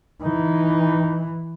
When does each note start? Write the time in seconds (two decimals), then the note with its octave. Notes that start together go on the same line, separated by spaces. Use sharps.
0.23 E3 D#4